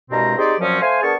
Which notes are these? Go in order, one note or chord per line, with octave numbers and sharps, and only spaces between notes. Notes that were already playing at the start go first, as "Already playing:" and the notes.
C2 G2 B2 G#3 C4 A#5
C4 D#4 G4 G#4 C5 D5
F#2 A#2 F3 F#3 C4 C#4
A3 C5 F5 G#5
B3 D4 G#4 A#4 A5 C#6